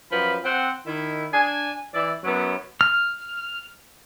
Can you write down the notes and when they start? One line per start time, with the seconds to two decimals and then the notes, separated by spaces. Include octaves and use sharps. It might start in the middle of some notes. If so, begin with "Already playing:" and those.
0.12 F#2 F3 B4 B5
0.44 C4 F#5
0.86 D#3 E4
1.33 D4 G#5
1.94 E3 E4 D5
2.24 F#2 F#3 B3 E4
2.81 F6